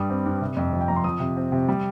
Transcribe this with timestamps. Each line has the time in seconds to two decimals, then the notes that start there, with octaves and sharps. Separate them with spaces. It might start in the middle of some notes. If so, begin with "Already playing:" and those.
Already playing: G2 G3 D#6
0.10 C4
0.26 G2
0.41 C3
0.57 F2
0.73 F3
0.81 G5
0.88 F2 A#5
0.96 C6
1.04 F3 D#6
1.20 C3
1.37 C4
1.52 C3
1.68 G3